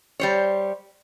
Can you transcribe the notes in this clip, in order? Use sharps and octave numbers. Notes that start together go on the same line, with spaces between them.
G3 C5 C#5